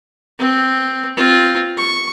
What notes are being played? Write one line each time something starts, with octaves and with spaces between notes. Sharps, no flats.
C4
C4 F4
C#6